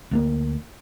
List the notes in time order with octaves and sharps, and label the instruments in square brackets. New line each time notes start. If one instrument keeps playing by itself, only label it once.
[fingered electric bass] D2 A3 A#3